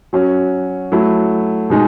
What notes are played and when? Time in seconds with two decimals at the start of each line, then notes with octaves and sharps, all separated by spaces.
0.13 F#3 C#4 F#4
0.92 F#3 A3 E4
1.70 B2 G#3 D#4